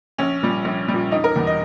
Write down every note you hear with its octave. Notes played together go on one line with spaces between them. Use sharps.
A#1 C#4
A#2 G3
A#1
G3
A#2
E1 D#4
A#4
E2 B2 G3
D#5